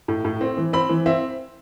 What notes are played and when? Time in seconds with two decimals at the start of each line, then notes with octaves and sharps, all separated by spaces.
0.08 A2
0.25 A2
0.41 C4
0.57 E3
0.73 C4 B5
0.89 E3
1.06 C4 E5